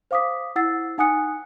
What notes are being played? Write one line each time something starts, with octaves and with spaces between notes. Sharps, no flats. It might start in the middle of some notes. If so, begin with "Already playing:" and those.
C5 F5 D6 D#6 B6
E4 F#5 E6 A6 C7
D#4 F#5 G#5 D#6 F#6 C#7